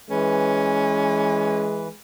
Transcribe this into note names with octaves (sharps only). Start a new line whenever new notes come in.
E3 G#3 C#4 B4